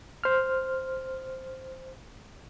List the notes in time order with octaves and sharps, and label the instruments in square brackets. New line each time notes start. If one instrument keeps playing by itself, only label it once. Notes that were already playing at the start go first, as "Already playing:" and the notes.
[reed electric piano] C5 F6